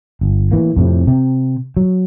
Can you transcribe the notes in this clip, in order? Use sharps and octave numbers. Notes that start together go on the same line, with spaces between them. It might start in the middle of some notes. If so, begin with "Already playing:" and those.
G1
A2 E3 A#3
F2 A2 C3
C3 C4
F#3